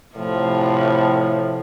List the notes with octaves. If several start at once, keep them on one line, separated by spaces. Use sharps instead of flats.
A2 C3 F3